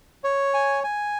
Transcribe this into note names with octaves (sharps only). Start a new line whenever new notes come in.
C#5
G#5
G#5